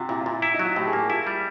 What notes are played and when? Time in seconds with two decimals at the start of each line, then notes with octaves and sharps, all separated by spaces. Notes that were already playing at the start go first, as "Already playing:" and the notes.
Already playing: C3 F4 F#4
0.09 A#2 E4
0.21 F4
0.26 A#2
0.32 E4
0.42 E4
0.54 D#4
0.60 F#3
0.65 F4
0.76 A2 G4
0.87 G#4
0.93 A#3
0.99 G4
1.10 E4 F4
1.27 G3